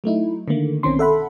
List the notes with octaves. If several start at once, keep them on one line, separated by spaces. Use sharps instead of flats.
F#3 A3 D#4 E4
D3 D#3 A3 A#3
B1 B2 D#3 C4 C#4 C6
A4 E5 F#5 B5